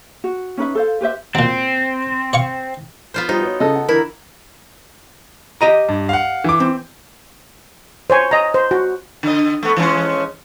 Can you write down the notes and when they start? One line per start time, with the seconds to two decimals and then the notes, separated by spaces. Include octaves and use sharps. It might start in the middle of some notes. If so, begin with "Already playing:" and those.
0.24 F#4
0.57 C#4 D#4 B4 E5
0.75 A4 C5 F5
1.01 G4 B4 C5 E5
1.35 A#2 F#3 C4
2.33 C#5 F5 C#6
3.14 B3 F4 C5
3.29 G3 D#4 F4 C5
3.41 F#4 B4 C#5
3.60 C#3 G#4 A4 D#5
3.75 F#5
3.89 D3 E3 E4 A#4
5.61 G4 D#5 A#5
5.89 G2
6.09 F5 F#5
6.44 E3 D6
6.60 C4
8.10 C5 C#5 G#5
8.31 D#5 A#5
8.54 C5
8.71 F#4
9.23 D3 D#5
9.63 A3 B3
9.77 E3 G#3 C#4